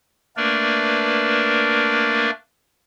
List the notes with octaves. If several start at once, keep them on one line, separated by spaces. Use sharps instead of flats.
A3 A#3 D4 A#4 B4 D5